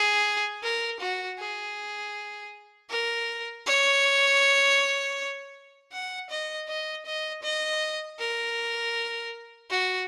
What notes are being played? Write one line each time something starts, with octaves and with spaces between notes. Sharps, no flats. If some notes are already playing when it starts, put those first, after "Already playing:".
Already playing: G#4
A#4
F#4
G#4
A#4
C#5
F#5
D#5
D#5
D#5
D#5
A#4
F#4